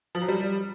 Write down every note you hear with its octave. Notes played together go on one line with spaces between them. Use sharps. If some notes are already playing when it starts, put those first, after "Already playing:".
F3
F#3
G3